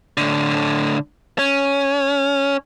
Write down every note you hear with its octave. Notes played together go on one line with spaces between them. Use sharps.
A2 D3
C#4